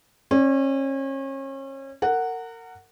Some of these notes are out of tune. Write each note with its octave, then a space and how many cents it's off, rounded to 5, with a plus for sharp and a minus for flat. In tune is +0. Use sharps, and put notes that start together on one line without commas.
C#4 -35 D5 -10
A#4 -30 F#5 +0